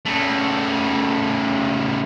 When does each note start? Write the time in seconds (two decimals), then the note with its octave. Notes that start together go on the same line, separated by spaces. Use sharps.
0.06 C#3 A3